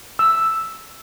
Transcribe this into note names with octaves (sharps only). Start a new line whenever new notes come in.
E6